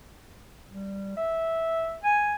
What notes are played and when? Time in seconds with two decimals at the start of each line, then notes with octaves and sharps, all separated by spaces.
0.70 G3
1.17 E5
2.04 G#5